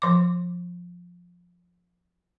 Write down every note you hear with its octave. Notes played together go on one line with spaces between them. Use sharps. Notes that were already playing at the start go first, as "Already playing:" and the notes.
F3 D6